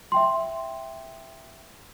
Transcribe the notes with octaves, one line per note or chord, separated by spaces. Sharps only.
E5 G5 C6